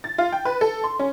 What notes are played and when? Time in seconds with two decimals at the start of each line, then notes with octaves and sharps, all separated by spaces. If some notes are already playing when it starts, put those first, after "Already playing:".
0.04 A6
0.18 F4
0.32 G5
0.45 B4
0.61 A4
0.84 C6
0.99 C#4